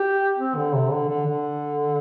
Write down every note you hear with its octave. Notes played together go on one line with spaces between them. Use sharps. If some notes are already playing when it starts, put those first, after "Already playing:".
Already playing: G4
C4
D3
C3
D3
D3
D3